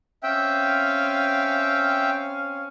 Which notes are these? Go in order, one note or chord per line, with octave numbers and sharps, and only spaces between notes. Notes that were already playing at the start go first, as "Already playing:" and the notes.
C4 C#4 E5 F5 G5